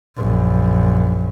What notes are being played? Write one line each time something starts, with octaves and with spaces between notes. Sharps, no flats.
A#1 F#2